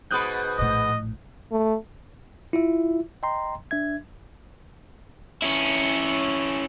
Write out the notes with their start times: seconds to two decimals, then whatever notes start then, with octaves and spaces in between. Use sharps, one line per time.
0.11 G#2 B2 B4 D#6 F#6 G6
0.58 A#1 A2 D#5
1.52 A3
2.53 E4 F4 E5
3.23 D#5 G5 A#5 C6
3.71 D4 E5 G#6
5.42 C#4 E4